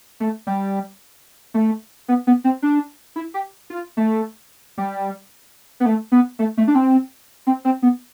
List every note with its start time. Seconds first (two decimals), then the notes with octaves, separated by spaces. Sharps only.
0.20 A3
0.47 G3
1.54 A3
2.08 B3
2.27 B3
2.44 C4
2.62 D4
3.16 E4
3.34 G4
3.70 F4
3.97 A3
4.78 G3
5.80 B3
5.86 A3
6.12 B3
6.39 A3
6.57 A3
6.67 D4
6.75 C4
7.47 C4
7.65 C4
7.82 B3